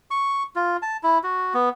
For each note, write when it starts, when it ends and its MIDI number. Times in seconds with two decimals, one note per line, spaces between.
0.11 0.43 85
0.55 0.77 65
0.82 0.97 81
1.03 1.18 64
1.23 1.54 66
1.54 1.69 59